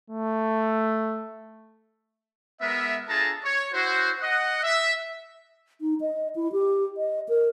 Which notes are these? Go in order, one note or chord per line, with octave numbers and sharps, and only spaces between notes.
A3
G#3 B3 A#4 E5
D4 F4 G#4 A4 A5 A#5
C#5
E4 F#4 C5
D#5 F#5
E5
D#4
D#5
E4
G4
D#5
A#4